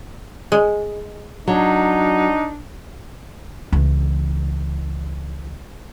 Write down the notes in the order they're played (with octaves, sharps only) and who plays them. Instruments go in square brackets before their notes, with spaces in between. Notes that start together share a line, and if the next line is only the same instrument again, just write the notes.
[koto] G#3
[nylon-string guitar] F#3 [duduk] D4 [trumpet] D#4
[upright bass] C#2 E3